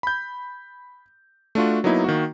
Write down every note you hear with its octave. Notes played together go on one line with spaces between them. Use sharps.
B5 G6
A3 D4 F4 F#4
F#3 A#3 B3 D#4 E4
D#3 A#3 F#4